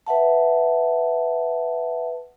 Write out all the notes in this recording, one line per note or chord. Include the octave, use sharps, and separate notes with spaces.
B4 E5 F#5 A5